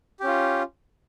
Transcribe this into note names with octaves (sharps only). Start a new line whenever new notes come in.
C#4 F4 G4